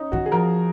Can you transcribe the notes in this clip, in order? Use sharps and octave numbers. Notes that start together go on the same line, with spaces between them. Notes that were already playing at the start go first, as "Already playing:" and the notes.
Already playing: C#4 D#4
D#3 F#4
G#4
F3 A#4